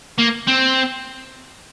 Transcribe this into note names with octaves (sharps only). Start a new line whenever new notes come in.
A#3
C4